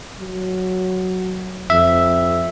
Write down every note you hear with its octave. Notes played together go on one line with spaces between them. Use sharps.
F#3
F2 E5